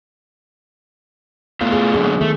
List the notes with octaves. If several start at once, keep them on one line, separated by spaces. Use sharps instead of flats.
A2 A3 B3 F4
G#4
F#2 A#2 D3 G#4
D#3 A3